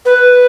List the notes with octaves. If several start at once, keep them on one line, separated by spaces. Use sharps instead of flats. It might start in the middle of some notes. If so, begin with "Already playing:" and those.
B4